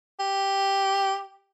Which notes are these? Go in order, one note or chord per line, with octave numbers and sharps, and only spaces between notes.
G4